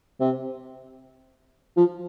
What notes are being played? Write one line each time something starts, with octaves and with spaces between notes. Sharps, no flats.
C3
F3